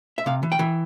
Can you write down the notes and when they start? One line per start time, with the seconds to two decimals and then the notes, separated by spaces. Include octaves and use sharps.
0.18 E5
0.26 C3 F5
0.43 E3
0.52 G5
0.59 E3